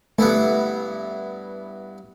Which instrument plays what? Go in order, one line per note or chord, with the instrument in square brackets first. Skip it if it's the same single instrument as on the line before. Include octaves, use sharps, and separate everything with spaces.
[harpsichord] G2 B3 E4 [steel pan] A3